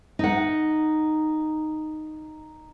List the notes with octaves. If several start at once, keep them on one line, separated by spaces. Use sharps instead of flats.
D#4 F#5